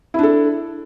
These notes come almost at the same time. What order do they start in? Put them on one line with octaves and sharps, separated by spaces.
E4 D4 A4